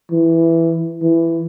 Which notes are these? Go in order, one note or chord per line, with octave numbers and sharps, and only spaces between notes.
E3
E3